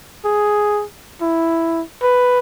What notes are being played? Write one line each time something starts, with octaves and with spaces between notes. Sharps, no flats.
G#4
E4
B4